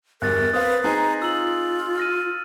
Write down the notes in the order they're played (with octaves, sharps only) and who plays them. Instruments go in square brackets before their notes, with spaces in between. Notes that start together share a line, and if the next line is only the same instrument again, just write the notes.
[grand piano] G1 E2 [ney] A#4 [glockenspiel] F#6 A6
[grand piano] C4 F5 [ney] B4 [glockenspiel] D#6
[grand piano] C4 D#4 G#4 [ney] A#5
[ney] F4 [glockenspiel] E6 F#7
[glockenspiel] F6 A#6 D#7